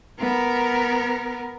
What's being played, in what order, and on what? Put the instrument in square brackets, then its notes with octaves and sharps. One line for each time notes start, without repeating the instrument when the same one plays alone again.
[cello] B3 A#4